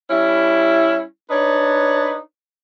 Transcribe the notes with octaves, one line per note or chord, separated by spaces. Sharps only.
G3 C#4 E4
D4 D#4 B4 C#5